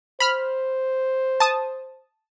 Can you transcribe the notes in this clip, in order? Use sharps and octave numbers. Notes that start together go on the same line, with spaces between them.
C5 B5 F6
A5 D#6